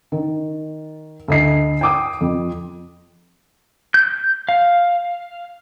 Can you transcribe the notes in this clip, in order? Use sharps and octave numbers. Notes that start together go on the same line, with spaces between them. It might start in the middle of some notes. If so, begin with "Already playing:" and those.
D#3
D2 D#5 C7
G5 D6 D#6
F2
G6
F5